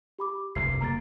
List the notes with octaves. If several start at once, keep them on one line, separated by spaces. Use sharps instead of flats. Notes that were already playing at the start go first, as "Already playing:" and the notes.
G4 B5 D6
F1 C2 G2 C7
F#1 A#3 A#5 A6